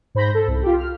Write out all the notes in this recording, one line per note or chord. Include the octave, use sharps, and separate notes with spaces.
G#2 C5 B5 G6 A#6
A4
C2
F4 G4
F6